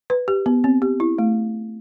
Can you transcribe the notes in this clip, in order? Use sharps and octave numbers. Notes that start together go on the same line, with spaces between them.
B4
G4
B3
C4
G4
E4
A3